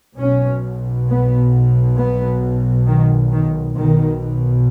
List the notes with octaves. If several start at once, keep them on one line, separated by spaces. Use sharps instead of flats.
B1 B2 C#4
B3
B3
D#3
D#3
B1 B2 D#3